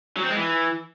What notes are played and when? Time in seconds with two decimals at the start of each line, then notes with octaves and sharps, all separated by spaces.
0.17 F#3
0.23 C4
0.30 G#3
0.36 E3